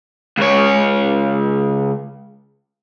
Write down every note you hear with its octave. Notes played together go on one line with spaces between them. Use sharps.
C#2 C#5